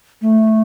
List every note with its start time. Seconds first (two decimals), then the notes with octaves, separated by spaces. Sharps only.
0.22 A3